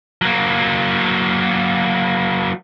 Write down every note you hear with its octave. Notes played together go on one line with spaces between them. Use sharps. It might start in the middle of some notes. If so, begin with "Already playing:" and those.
F#3 A#3